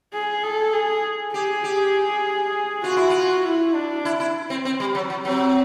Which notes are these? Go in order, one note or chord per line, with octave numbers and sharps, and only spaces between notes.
G#4
A4
G#4
G4 G#4
G4
F4 F#4
E4
F4
E4
D4
E4
E4
C4
C4
G3
F#3
F#3
F#3 C4